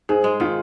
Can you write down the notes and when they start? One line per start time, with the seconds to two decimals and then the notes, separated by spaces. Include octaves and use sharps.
0.09 G#2 G#4
0.24 G#3
0.40 D#3 F4